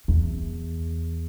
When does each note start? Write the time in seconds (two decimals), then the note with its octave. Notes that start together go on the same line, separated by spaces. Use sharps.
0.08 E2